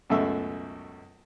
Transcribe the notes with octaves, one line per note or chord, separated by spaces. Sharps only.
C#2 F#2 B2 A3 E5 E6